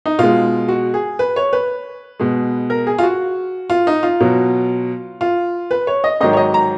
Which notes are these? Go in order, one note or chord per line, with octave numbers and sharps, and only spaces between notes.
D#4
B2 G#3 F4
F#4
G#4
B4
C#5
B4
B2 G#3
A#4
G#4
F4
F#4
F4
D#4
F4
B2 F#3
F4
B4
C#5
D#5
G#2 D#3 F#3 D#5
C#5
D#5
A#5